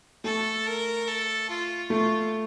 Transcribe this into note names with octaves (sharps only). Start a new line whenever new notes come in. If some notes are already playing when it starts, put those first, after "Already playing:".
A3 A4
A#4
A4
F4
A3 F4